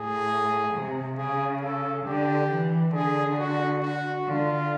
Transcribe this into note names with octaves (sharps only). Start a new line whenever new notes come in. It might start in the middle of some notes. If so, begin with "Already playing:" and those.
Already playing: A2 G#4
C3
C#3 G#4
A4
D3 G4
E3
D3 G#4
F#4
F#4
D3 F4